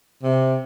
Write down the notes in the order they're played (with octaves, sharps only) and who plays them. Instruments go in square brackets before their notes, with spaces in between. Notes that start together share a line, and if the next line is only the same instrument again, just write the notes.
[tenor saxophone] C3